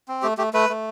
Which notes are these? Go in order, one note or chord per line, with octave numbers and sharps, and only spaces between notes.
C4
A3 G4
A3 G4
A3 B4
A3